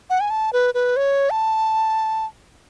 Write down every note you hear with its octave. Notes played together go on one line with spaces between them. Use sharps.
F#5
G#5
A5
B4
B4
C#5
A5